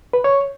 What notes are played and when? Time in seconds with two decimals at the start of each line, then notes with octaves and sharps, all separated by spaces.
0.13 B4
0.24 C#5